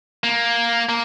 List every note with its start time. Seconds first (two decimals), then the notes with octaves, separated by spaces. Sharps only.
0.24 A#3
0.89 A#3